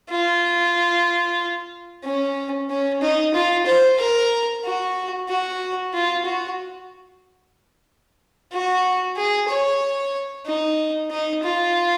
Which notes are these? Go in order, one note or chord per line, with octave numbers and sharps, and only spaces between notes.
F4
C#4
C#4
D#4
F4
C5
A#4
F#4
F#4
F4
F#4
F#4
G#4
C#5
D#4
D#4
F4